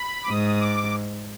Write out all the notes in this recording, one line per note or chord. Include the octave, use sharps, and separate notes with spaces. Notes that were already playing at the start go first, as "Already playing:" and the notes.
Already playing: B5
D6
G#2 D#6
D6